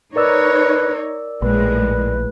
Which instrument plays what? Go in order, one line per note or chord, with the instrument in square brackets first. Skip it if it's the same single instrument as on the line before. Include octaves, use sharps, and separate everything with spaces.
[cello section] D#4 C#5 [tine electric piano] A#4 D5 E6 [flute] B4
[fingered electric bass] A#1 [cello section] A2 G#3 [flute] B4